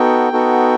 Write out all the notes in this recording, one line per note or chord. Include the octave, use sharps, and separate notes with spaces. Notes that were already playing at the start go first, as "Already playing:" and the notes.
Already playing: B3 D#4 F#4 A4 G5
B3 D#4 F#4 A4